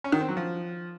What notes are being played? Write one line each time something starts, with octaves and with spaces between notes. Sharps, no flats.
C#4
D#3
C4
F#3
F3